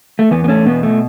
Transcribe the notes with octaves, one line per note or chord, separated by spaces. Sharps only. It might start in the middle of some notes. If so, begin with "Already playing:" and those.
A3
E2 B3
B3
A3 C#4
B2 B3
A3